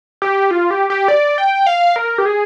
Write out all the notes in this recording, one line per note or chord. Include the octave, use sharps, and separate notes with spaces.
G4
F4
G4
G4
D5
G5
F5
A#4
G4
G#4